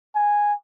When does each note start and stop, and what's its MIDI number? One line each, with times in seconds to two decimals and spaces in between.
0.16 0.54 80